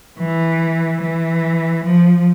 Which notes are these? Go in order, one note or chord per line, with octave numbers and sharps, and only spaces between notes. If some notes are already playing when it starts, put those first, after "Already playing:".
E3
E3
F3